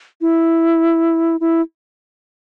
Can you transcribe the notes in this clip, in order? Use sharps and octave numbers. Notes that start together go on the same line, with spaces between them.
E4
E4